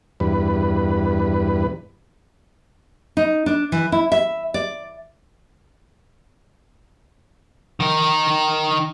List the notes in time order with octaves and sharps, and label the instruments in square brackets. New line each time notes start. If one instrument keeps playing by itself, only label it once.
[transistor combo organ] E2 G2 B4
[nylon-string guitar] D#4
D4
E3
E4
E5
D5
[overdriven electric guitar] D#3 A#4